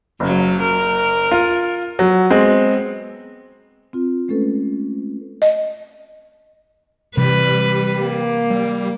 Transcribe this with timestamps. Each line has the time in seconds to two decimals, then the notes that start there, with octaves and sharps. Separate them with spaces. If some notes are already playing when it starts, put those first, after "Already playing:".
0.20 F#1 C#3 F#3
0.62 A#4
1.32 F4
1.99 F#3
2.30 G#3 B3 C4
3.93 C4 F4
4.28 G#3 A3 C#4 A4 B4
5.42 D#5
7.17 C3 E3 G3 B4
7.99 A#3
8.50 G3